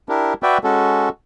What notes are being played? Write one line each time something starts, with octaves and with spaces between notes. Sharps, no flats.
D4 E4 G4 A#4
F#4 B4 D5 E5 G5
G#3 C#4 F#4 A4